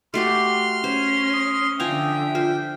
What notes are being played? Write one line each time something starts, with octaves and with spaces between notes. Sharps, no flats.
A3 F#4 G4 C6 F6
C#4 C5
D#6
D3 F3 E5 G5 G#5 A#5
F4 C5